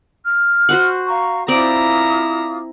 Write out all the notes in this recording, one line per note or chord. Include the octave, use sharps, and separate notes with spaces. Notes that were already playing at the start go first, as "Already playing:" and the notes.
F6
F#4 C5 F#5
F5 A#5 C#6
C4 E4 F4 D5 A#5 D6 D#6